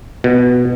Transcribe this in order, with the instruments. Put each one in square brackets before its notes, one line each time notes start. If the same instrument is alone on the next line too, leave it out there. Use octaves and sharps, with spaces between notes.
[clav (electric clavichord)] B2